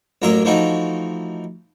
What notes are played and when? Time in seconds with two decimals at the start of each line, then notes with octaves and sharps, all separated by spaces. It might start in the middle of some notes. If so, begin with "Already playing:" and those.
0.22 A1 F#2 A#3 A#4 E5 C6
0.45 E3 F3 A3 D#4 F4 F#4